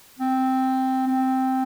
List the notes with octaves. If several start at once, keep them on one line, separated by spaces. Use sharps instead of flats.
C4
C4